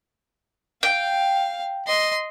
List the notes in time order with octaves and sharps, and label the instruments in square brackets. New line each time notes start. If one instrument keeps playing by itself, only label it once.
[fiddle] F5 [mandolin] G5
[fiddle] D#5 C6